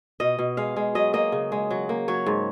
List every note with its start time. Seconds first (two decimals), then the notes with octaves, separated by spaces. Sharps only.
0.20 B2 D#5
0.39 B2
0.57 G#3 F5
0.76 G#3
0.95 F#3 D#5
1.13 A#3 D#5
1.32 C#3
1.52 G#3
1.71 F#3
1.89 A#3
2.08 F#3 C#5
2.27 G#2